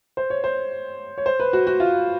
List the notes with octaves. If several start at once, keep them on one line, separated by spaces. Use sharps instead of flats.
C5
C#5
C5
C#5
C5
B4
F#4
F#4
F4